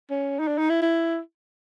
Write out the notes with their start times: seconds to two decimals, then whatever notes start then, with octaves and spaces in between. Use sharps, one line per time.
0.10 C#4
0.39 D#4
0.48 D4
0.58 D#4
0.70 E4
0.82 E4